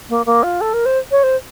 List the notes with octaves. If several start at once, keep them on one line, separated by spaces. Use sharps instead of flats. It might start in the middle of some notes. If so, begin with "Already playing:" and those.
A#3
A#3
F4
A4
A#4
C5
C#5
C5